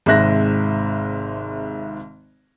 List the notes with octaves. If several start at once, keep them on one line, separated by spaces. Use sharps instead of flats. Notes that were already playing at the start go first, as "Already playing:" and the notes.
G#1 G#2 C3 E5 F#6 A#6